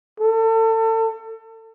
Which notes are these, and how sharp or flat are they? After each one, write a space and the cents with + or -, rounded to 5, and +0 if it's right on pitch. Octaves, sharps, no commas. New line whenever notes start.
A4 +30